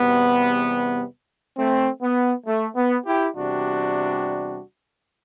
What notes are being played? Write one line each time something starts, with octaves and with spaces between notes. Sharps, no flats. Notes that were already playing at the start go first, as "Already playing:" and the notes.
Already playing: E2 C3 G3 B3
A3 C4
B3
A3
B3
E4 G4
E2 C3 G3 D4 F#4